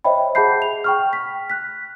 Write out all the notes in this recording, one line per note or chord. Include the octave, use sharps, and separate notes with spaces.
C5 C#5 D#5 E5 G5 B5
G#4 F#5 A5 B5 G6 C7
F7
G5 C#6 F6
B6
F#6 B6